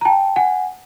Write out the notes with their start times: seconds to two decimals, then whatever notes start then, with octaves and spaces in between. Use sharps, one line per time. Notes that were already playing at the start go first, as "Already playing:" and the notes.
0.01 A#5
0.05 G5 A5
0.36 F#5 G#5